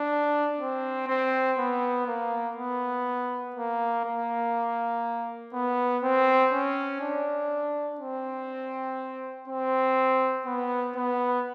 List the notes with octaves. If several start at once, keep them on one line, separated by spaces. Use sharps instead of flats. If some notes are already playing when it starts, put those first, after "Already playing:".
Already playing: D4
C4
C4
B3
A#3
B3
A#3
A#3
B3
C4
C#4
D4
C4
C4
B3
B3